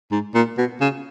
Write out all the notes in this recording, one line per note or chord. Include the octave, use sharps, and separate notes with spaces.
G#2
A#2
B2
C#3